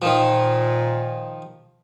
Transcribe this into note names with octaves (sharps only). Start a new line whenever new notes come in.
A#2 D#3 F3